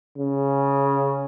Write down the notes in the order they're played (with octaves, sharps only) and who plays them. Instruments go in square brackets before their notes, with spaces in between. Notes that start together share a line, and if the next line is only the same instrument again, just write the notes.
[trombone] C#3